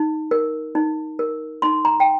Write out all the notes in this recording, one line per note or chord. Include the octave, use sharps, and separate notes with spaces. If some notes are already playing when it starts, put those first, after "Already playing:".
Already playing: D#4
A#4
D#4
A#4
D#4 C6
A#5
G5